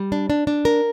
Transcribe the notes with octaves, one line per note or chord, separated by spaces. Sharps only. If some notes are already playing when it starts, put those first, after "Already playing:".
Already playing: G3
D4
D4
D4
A#4